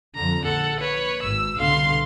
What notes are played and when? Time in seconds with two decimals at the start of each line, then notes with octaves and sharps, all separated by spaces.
0.15 F2 D3 A#5
0.44 A#1 A4 F#5
0.80 B4 C#5
1.23 G#1 E6
1.57 C2 B2 D3 F5 C6